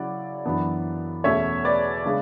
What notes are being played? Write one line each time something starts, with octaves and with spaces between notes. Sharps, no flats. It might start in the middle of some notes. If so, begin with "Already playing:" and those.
Already playing: C#3 F#3 C#4 E4 D5 F#5
F#2 E3 B3 D4
E2 B2 A3 C#4 C#5 E5
B4 D5
C#3 G#3 B3 D4